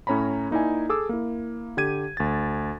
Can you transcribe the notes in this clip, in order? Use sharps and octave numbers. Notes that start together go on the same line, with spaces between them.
A2 C#4 C#5 A#5 B5
A#3 D#4 E4 D5 G#5
G#4 A4 D6 E6
A#3 E4
D3 G4 G#6 D#7
D2 A6